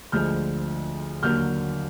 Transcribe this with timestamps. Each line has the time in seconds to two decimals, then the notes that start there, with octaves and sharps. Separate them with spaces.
0.12 D2 D3 F3 G#3 F6 G6
1.23 D#2 D3 F#3 A#3 F6 G6